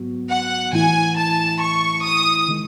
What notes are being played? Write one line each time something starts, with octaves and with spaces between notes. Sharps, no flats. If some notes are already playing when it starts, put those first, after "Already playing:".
Already playing: G#2 F#3 B3 F#4
F#5
A2 E3 A3 E4 G#5
A5
C#6
D#6
D#3 G#3